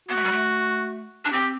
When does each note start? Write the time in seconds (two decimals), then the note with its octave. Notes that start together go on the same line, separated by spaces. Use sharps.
0.09 B3 F#4
0.16 A3
0.24 G3
0.32 A3
1.25 D4
1.32 C4 G4